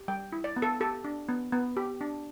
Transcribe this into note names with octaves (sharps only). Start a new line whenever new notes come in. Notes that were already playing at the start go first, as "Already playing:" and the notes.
Already playing: G4
G3 G5
E4
D5
B3
A4
G4 A4
D4
B3
B3
G4
D4